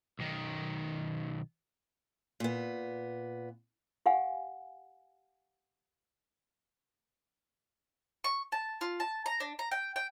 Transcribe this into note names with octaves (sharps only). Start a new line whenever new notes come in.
B1 D#3
A#2 B3
G4 F5 F#5 G#5
C#6
A5
F4
A5
A#5
D4
A#5
G5
G5